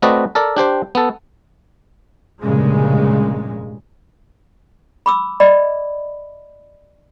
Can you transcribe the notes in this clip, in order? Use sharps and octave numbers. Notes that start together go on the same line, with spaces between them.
A3 C4 F#4 B4 D5 D#5
A4 A#4 D5
D4 G4 C5 G5
B3 A4
F1 G2 A#2 C#3 G#3
B5 D6 E6
D5 D#5 B5